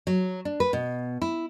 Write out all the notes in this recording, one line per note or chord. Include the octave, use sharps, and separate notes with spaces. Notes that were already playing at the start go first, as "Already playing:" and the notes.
F#3
D4
B4
B2
E4